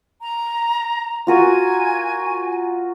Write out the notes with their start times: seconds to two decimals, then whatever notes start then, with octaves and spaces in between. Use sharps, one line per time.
0.23 A#5
1.27 F4 F#4 A#4 G#5